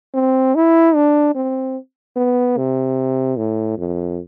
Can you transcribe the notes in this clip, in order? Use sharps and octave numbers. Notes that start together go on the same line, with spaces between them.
C4
E4
D4
C4
B3
C3
A2
F2